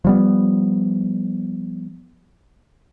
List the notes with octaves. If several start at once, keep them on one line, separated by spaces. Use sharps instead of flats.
F3 G3 B3